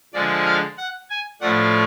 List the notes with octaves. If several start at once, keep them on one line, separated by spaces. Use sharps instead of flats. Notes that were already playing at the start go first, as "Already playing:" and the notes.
D3 F3 G#3 D4 D5
F5
F#5
G#5
A2 F3 A3 D4 F#5